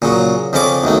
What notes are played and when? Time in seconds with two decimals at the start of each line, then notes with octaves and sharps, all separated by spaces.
0.02 A#2 C#3 F#3
0.53 F2 C#3 F3 C#4 D5 D6
0.84 B1 F#2 D#3 A3